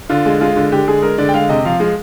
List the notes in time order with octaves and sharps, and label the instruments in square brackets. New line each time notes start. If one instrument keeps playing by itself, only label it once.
[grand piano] D3 F4
G#3
G#3 F4
D3
D3 G4
G#3 G#4
G#3 A#4
D3 D5
G5
G#3 F5
C3 D#5
F3 F5
G#3 F5